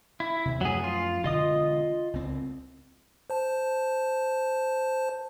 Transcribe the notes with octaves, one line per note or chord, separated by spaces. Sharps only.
E4
D#2 C3
F#2 F3 F#3 A3 G#4
F4
E1 D3 F4 D#5 D#6
C#2 C4
C5 A5